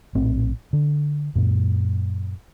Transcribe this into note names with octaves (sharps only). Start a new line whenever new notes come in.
A#1 A2 C4
D3
F#2 A#2